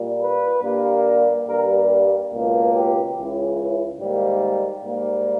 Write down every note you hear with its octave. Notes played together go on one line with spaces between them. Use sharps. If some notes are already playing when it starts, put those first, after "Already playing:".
Already playing: A#2 G3 A#3
B4
G2 G3 A#3
G2 G3 A#3 A#4
C#2 B2 A#3
G4
C#2 C#3 E3
G#2 D#3 G3 A#3
G#2 G3 A#3